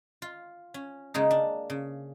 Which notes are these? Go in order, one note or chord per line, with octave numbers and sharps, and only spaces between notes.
F4
C#4
C#3 G#3 A#3 C#4 D#4
D4
C#3